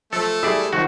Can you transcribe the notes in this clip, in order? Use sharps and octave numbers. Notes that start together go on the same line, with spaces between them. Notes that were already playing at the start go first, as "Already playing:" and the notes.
F3 A3 A4
G3 E4 G#4 D5 E5
D#3 F3 F#4